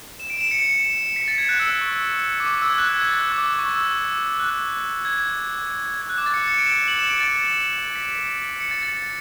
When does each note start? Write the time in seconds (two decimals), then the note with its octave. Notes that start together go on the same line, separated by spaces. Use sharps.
0.20 E7
0.30 D7
0.41 E7
0.51 C#7
1.16 B6
1.28 A6
1.38 G#6
1.49 F#6
1.60 E6
1.70 E6
1.81 C#6
2.40 D6
2.46 C#6
2.54 D6
2.62 E6
2.70 G#6
2.78 F#6
2.89 G#6
3.00 G#6
3.11 A6
3.22 F#6
3.32 D6
3.43 D6
3.59 C#6
3.75 E6
4.40 F#6
5.05 G#6
6.02 G#6
6.10 F#6
6.18 D6
6.26 A6
6.34 C#7
6.48 C#7
6.57 D7
6.66 E7
6.77 E7
6.88 F#7
6.99 E7
7.10 D7
7.20 A6
7.95 B6
8.60 C#7
8.71 A6
8.82 A6